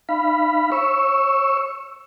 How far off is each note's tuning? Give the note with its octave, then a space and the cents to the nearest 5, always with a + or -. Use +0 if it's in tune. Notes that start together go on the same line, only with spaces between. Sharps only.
D#4 -35 F5 -30 B5 +0
C#5 -30 C#6 +0 E6 +5